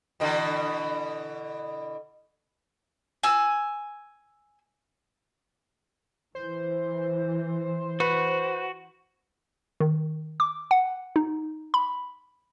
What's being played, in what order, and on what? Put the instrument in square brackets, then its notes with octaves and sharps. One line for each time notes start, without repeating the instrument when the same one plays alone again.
[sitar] B2 D3 E3
[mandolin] G#5 E6
[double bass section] E3 [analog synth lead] C5
[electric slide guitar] F#4 [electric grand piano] B4
[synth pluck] D#3
D6
F#5
D#4
B5